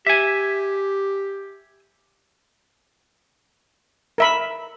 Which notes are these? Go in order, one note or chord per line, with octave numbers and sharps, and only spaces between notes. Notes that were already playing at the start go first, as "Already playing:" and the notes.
G4 E5 G#5
A#4 E5 B5